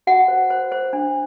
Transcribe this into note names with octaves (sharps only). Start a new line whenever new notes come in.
F#4 F#5
C5
C5
C5
D4